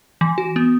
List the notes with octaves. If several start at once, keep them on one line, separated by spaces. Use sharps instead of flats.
E3
F#4
B3